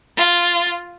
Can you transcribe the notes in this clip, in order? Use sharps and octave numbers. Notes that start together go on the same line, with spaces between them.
F4